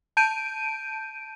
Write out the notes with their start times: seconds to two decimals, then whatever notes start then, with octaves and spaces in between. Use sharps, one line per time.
0.17 A5 G6 D7 D#7